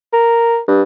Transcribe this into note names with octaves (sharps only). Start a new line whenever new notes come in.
A#4
G2